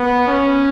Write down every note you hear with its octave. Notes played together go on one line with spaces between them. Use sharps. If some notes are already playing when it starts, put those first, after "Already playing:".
Already playing: B3
C#4